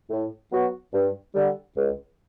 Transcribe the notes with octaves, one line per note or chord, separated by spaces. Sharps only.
A2
F#3 B3 F#4
G2
D3 G3
C#2